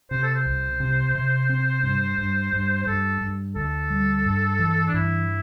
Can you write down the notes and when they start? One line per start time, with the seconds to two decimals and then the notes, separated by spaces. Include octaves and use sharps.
0.11 C3 C5
0.23 A4
0.35 C5
0.46 C2
0.80 C3
1.15 C3
1.49 C4
1.83 G2
2.18 G2
2.53 G2
2.82 C5
2.87 G2 A4
3.21 G2
3.55 D2 A4
3.90 G3
4.25 G2
4.59 E3
4.88 D4
4.94 G2 E4